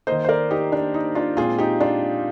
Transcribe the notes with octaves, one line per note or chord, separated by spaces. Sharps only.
D#3 A#3 C5 D#5
C5
A#4 D5
D#4 G4
D4
D#4
D4 F4
A#2 G#3 C4 F4 G#4
D#4 G4
D4 F4